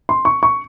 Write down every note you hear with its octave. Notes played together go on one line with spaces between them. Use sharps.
C6
C#6
C#6